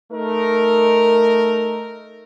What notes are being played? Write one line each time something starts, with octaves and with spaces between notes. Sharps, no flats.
A3 D#4 A#4